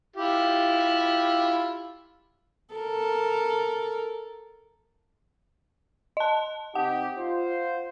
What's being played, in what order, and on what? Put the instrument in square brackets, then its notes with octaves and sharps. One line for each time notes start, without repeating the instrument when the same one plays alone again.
[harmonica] E4 F4 G4
[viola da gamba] A4 A#4
[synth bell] D#5 A5
[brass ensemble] C3 D#4 G4 [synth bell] F#5
[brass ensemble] F4 C5